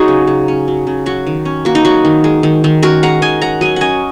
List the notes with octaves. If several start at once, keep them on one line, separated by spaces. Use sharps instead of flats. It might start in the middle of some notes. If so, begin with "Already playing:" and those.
Already playing: F#3 D#4 F#4 G#4
C#3
C#3
C#4
F#3
C#3
F#3 F#4
D#3
C#4
A#3 F#4
D#4
F#3 F#4
D#3
G#3
D#3
D#3
C#4 F#4 A#4
G#3 F#5 A#5
D#3 D#5 G#5
C#4 F#5 A#5
F#3 D#5 G#5
C#4 D#5 F#5 G#5